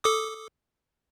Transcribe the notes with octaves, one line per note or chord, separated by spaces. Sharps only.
A4 D6 D#6